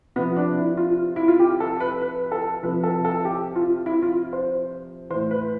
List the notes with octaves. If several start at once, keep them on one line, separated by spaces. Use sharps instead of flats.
C3 F3 B3
D4
E4
F4
E4
F4
G4
A4
B4
B4
A4
C3 F3 B4
A4
A4
G4
F4
E4
F4
C5
E3 C5
A2
B4